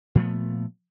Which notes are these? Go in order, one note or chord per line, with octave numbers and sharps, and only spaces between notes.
A#2 F3 A3 B3